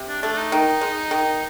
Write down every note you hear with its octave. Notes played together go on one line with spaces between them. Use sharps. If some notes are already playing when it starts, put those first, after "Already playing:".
Already playing: C3
D4
A3 D4
D4
D#4
D#3
G#3
D#3